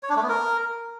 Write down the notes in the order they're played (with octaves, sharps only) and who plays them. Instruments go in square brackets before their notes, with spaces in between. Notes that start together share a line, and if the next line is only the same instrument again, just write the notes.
[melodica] C#5
D4
A3
B3
A#4